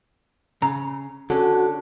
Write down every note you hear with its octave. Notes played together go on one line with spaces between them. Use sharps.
C#3 A#5
D3 C#4 F#4 A4